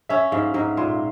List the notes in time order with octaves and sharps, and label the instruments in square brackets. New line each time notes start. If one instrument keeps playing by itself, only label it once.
[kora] C#4 [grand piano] E5
[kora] G#2 [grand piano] F5
[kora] G#2 [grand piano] A#5
[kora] A#2 [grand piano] C6